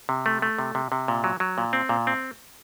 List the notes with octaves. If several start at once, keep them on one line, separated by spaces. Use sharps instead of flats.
C3
A3
A3
C3
C3
C3
A#2
F#3
F#3
A#2
C4
A#2
C4